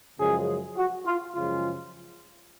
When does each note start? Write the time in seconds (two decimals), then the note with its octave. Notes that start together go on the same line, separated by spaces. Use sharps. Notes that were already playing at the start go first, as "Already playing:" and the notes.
0.19 F#2 C#3 F3 G#3 G#4
0.77 F#4
1.06 F4
1.35 F#2 C#3 F3 G#3 F4